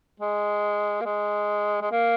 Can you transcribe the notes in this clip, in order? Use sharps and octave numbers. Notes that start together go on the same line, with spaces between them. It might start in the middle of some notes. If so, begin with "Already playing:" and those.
G#3
A#3
G#3
G#3
A#3